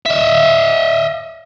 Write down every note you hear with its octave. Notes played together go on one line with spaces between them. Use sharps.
D#5 E5